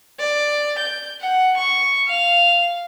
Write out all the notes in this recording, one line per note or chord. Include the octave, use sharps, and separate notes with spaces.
D5
G6
F#5
C#6
F5